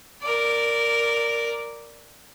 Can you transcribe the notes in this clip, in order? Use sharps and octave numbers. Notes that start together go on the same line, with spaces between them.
A#4 D5